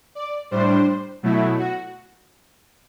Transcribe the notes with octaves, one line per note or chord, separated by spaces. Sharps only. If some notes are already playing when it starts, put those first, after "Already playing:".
D5
A2 G3 D4 C5
B2 F#3 A3 E4
F#4